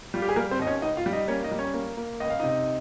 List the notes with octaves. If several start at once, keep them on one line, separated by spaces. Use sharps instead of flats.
G3 F4
G4
G#4
G3 A#3 A#4
C4 C5
D#2 D#5
C#4 C#5
C#2 D#4 D#5
F4 F5
G3
D#4 D#5
A#3 C#4 C#5
D#4 D#5
G3
C#4 C#5
A#3
A#3
C#2 D#5
F5
C3 D#4 D#5